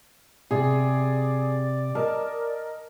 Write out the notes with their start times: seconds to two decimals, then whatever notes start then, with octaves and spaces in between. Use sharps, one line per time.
0.51 C3 G#4 D5
1.95 A#4 D#5 A5